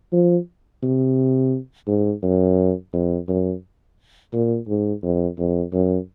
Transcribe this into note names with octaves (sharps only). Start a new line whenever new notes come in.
F3
C3
G#2
F#2
F2
F#2
A#2
G#2
F2
F2
F#2